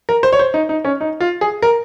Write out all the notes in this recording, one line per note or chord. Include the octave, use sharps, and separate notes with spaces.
A#4
C5
C#5
C5
D#4
D#4
C#4
D#4
F4
G#4
A#4